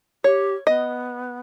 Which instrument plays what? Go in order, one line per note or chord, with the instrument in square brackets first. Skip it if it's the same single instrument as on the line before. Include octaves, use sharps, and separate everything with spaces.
[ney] G4 [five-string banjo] C#5
[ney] B3 [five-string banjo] D#5